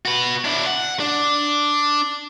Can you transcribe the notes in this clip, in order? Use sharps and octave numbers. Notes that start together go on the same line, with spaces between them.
F#4 B4
D4 E4
F#5
D4